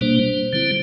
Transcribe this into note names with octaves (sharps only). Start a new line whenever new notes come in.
B2 G3 A#3 D4 C5
D3 G3 C4 E4